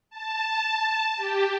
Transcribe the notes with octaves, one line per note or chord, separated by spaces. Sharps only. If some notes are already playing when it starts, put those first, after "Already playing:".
A5
G4